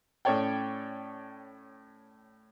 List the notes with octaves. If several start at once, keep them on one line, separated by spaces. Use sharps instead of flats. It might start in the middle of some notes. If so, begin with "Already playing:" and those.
A2 C#4 A4 C#5 D5 G5